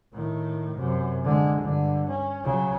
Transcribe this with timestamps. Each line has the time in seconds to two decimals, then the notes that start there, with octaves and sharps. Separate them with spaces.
0.14 A2 D#3
0.77 F#2 C3
1.24 D3 G#3
1.60 G2 D3
2.08 C#4
2.44 C#3 F#3